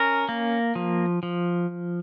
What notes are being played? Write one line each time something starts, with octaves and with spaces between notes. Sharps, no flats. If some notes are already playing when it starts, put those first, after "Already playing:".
Already playing: C#4 A#4
A#3
F3
F3